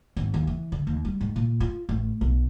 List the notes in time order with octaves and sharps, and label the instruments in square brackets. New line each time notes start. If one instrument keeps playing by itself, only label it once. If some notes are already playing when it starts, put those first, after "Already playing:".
[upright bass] G#1
D#2
E3
D3
D#2
G3
G#2
A#2
F4
A1
B1